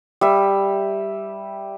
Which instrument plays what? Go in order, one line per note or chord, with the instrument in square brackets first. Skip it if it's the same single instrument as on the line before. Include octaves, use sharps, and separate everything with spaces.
[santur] G3 E5